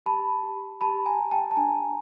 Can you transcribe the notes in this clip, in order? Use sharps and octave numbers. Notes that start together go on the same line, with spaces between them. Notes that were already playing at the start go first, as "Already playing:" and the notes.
G4 A5 B5
G4
G4 A5 B5
G#5 A#5
G4
G5 A5
A5
D4 G#5 A#5